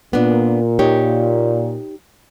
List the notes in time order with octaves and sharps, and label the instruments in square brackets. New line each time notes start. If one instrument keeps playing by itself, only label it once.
[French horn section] A#2 [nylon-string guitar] B3 D4
[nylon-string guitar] D#4 G4 C#5